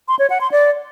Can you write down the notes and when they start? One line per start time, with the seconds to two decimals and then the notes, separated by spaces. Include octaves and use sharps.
0.08 C6
0.19 C#5
0.30 F#5
0.41 C6
0.52 D5